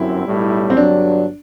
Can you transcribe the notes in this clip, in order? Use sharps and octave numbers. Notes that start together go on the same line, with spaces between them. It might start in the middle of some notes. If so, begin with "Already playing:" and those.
Already playing: G1 F#2 F#3 C4 E4
B1 A2 G3
C4
G1 G2 F#3 D4